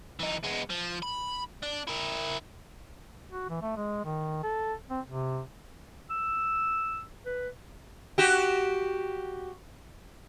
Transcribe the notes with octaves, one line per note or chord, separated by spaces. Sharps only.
E3 D#4
G#3 B3
F3
B5
D4
E4 A#4
F#4
E3
A3
G#3
D#3
A4
C4
C3
E6
B4
F#4 G4